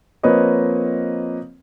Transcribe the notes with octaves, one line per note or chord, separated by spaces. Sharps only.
F3 A#3 C4 B4 C#5 D#5